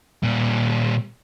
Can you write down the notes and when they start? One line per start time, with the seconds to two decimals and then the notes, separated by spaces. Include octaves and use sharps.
0.23 A#2 G3